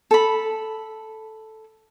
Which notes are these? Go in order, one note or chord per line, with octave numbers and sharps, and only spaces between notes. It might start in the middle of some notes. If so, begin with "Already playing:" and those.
A4 B5